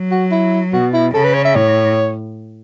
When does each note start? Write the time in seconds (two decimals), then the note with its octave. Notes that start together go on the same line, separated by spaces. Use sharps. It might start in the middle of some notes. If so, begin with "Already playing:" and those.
Already playing: F#3
0.11 F#4
0.31 E4
0.72 B2 F#4
0.93 E4
1.14 C#3 A4
1.25 B4
1.34 C#5
1.45 E5
1.55 A2 C#5